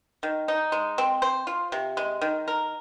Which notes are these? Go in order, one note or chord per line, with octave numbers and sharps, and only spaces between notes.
D#3
D#4
G#3
C4
C5
F4
C3
G#3
D#3
A#4